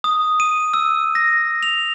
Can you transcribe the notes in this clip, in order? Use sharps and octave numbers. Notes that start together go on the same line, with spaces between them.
D#6
D#7
E6
A#6
F7